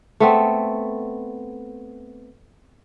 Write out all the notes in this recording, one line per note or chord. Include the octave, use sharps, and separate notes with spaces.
A3 B3 C4